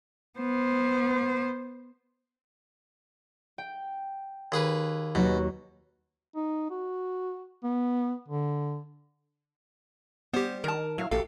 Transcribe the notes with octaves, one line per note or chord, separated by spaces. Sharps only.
B3 C5
G5
D#2 G#4 B4
D#2 B2 F#3 F#4
D#4
F#4
B3
D3
G3 B3 G4 C5
D#3 A#4 A5
F#3 E4 F5
A#1 F#4 G4 A4 F5